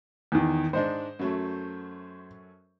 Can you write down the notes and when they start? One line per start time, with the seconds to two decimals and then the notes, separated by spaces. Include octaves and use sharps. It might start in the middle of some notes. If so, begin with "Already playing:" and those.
0.32 E2 D#3
0.73 G#2 G#3 D4 C5
1.19 F#2 F#3 A3